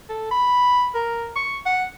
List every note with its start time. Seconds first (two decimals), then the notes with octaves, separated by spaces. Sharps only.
0.09 A4
0.31 B5
0.94 A#4
1.36 C#6
1.66 F#5